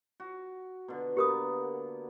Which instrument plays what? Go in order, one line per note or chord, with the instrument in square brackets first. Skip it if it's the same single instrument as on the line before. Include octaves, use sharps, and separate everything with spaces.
[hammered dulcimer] F#4
B2 D3
[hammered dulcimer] A#3 B3 [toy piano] G4 A#4 D#6